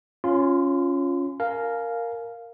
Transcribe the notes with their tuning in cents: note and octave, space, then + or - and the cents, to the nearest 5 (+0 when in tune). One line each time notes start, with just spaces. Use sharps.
C#4 +0 F4 +0 C6 -40
A#4 -5 F5 +0 G#5 +30